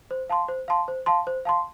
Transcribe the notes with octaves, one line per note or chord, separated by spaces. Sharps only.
C5
F5 A5 C6
C5
F5 A5 C6
C5
F5 A5 C6
C5
F5 A5 C6